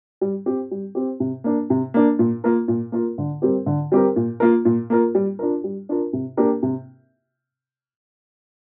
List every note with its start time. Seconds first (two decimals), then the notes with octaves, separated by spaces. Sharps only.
0.21 G3
0.46 C4 G4
0.71 G3
0.95 C4 G4
1.20 C3
1.44 A#3 D4
1.70 C3
1.94 A#3 D4
2.19 A#2
2.44 A#3 F4 A#4
2.68 A#2
2.92 A#3 F4 A#4
3.18 D3
3.42 G3 C4 G4 A#4
3.66 D3
3.92 G3 C4 G4 A#4
4.16 A#2
4.40 A#3 F4 A#4
4.65 A#2
4.90 A#3 F4 A#4
5.15 G3
5.39 D4 F4 A#4
5.64 G3
5.89 D4 F4 A#4
6.13 C3
6.37 A#3 D4 G4 A#4
6.63 C3